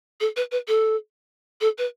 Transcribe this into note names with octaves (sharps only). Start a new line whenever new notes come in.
A4
B4
B4
A4
A4
B4